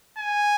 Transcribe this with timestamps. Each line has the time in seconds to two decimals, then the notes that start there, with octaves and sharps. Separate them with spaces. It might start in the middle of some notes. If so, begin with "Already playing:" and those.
0.18 G#5